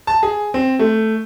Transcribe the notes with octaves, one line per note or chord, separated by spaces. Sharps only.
A5
G#4
C4
A3